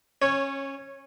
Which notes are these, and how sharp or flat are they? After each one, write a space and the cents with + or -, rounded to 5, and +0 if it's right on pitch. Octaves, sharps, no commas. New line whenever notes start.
C#4 -20 C#5 -5